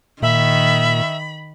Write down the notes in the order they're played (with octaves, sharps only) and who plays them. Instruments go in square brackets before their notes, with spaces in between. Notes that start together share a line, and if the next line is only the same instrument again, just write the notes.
[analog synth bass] A#2 [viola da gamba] D#3 [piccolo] E5 [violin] B5